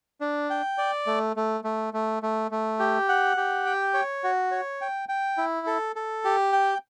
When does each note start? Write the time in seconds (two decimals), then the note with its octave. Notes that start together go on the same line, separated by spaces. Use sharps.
0.21 D4
0.50 G5
0.78 D5
1.07 A3
1.36 A3
1.64 A3
1.94 A3
2.23 A3
2.51 A3
2.80 G4
3.09 F#5
3.37 G4
3.66 G5
3.94 C#5
4.24 F#4
4.51 C#5
4.81 G5
5.09 G5
5.38 E4
5.67 A4
5.96 A4
6.25 G4
6.52 G5